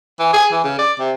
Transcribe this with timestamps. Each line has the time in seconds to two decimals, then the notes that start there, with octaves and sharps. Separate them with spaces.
0.20 E3
0.33 G#4
0.52 E3
0.64 C#3
0.79 D5
0.99 C3